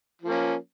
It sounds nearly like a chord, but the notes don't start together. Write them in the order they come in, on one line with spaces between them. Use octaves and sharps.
F3 A#3 C#4